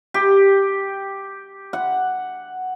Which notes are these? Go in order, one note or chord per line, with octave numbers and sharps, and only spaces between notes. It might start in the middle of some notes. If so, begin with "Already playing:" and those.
G4
F#5